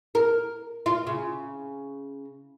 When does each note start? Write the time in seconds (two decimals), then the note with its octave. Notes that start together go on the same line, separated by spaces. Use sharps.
0.15 A#4
0.86 F4
1.07 C#3